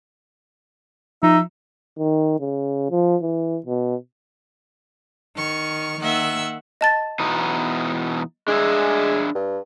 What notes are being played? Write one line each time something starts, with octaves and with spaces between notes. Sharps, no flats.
F3 D#4 E5
D#3
C#3
F3
E3
B2
D#3 C#6 F6
D#3 A#3 E5 F#5 E6
D#5 A5 A6
E2 B2 D#4
G#3 D4 G#4 E5
G2